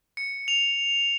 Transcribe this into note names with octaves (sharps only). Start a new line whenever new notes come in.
C#7
F7